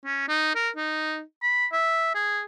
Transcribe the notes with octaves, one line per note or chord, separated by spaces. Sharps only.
C#4
D#4
A#4
D#4
B5
E5
G#4